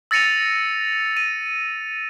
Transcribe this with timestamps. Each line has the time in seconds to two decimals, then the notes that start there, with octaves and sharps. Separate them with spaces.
0.11 E6 A6 A#6 C#7 D#7 F7
1.17 D#7